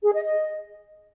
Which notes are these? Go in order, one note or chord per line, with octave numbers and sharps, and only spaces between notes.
G#4
D#5
D#5